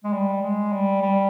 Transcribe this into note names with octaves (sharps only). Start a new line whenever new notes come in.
G#3
G3
G#3
G3
G3